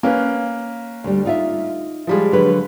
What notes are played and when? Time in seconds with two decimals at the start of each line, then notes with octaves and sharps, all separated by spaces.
0.03 A#3 C#4 B4
1.04 D2 G3
1.25 D#4 F4 E5
2.07 F3 G3 G#3
2.32 D3 F#3 B4